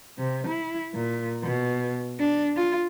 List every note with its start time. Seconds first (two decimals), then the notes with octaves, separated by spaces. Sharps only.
0.18 C3
0.48 E4
0.94 A#2
1.43 B2
2.19 D4
2.56 F4